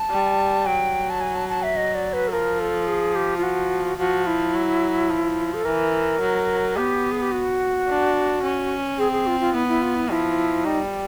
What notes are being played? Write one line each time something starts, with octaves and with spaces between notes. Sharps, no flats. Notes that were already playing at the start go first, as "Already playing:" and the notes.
Already playing: A5
G3
F#3 G5
A5
G#5
A5
A5
E5
D#5
D5
B4
A4
F3 A#4
A4
G#4
G4
F4
F#4
F3 F#4
E4
F#3
F3
A4
E3 A#4
F#3
B3 G4
G#4
G4
F#4
D4
C#4
C4 G#4
G#4
F4
F4
B3 E4
E4
F4
E4
F3 E4
G3 D#4